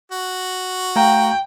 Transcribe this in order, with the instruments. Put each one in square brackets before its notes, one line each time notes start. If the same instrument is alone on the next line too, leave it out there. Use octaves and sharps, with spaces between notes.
[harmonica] F#4
[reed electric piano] A3 F5 A#5 [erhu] G5